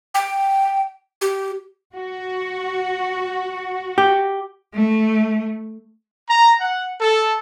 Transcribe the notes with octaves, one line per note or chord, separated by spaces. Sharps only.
G5
G4
F#4
G4
A3
A#5
F#5
A4